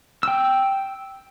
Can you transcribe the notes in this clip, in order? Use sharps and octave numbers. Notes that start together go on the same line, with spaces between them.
G5 E6